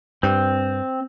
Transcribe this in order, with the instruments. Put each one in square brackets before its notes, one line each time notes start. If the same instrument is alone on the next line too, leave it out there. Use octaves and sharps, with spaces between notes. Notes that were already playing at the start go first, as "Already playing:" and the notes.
[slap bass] G2 [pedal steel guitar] C4